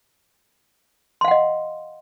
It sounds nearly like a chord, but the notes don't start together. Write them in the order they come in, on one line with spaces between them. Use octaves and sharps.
C6 F5 F#5 D#5